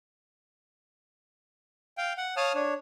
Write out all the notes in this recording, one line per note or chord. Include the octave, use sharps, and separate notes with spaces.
F5 G5
F#5
C#5 F5 A5 D#6 F6
D4 C#5